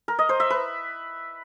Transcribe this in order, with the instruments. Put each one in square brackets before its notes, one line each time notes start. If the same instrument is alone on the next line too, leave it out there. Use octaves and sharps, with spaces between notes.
[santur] A#4
D#5
C5
E5
B4